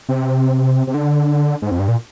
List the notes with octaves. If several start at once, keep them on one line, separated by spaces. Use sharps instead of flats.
C3
C3
D3
G#2
F2
G2
A#2